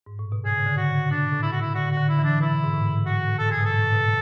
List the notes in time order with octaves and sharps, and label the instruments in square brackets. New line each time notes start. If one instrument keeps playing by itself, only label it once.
[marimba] G#2
A2
B2
[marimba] C#3 [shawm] G#4
[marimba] C#3
D3
[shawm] F#4
[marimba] C#3
[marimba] B2 [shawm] D4
[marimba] A2
[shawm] E4
F#4
E4
[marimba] D3 [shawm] F#4
[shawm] F#4
[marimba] D3
[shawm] E4
[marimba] E3
[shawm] D4
[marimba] B2 [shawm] E4
[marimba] G#2
A2
[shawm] F#4
[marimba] A2
[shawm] A4
[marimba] G#2 [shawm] G#4
[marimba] B2 [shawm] A4
[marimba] A2
A2
B2